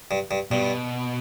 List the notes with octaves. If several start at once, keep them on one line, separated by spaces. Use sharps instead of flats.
G2
G2
G2 B2